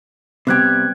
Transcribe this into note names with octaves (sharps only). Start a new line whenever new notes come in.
C3 G3 B3 G4 F#6 G#6